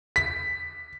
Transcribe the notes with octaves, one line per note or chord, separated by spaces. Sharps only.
B6